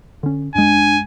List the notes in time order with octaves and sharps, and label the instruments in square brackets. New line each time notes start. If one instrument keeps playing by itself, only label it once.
[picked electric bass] D3 C#4
[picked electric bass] F#2 G#3 [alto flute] D4 [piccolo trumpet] G#5